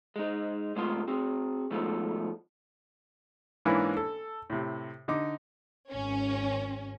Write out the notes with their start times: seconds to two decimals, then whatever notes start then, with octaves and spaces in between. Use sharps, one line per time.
0.16 G#3 D#4
0.76 C3 G#3 A3 B3 F4 C6
1.08 C4 F#4 G#4
1.71 G#2 B2 D#3 F3 G#3 A3
3.65 G#2 E3 A#3 C#4 D4 E4
3.97 A4
4.50 A2 C3
5.08 D3 D#4 D6
5.91 G#1 C#4